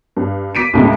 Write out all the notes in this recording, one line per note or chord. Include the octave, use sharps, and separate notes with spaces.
G2
D6 B6 D7 D#7
D#2 A2 C#3 G#3